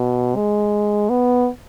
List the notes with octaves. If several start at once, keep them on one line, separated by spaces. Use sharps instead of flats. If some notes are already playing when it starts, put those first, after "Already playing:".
Already playing: B2
G#3
B3